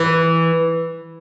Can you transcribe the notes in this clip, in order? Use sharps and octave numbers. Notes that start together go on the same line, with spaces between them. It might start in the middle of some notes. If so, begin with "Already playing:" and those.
Already playing: E3